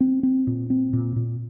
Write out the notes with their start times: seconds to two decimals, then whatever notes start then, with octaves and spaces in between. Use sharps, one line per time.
0.01 C4
0.23 C4
0.47 A#2
0.70 C4
0.93 A#2
1.16 A#2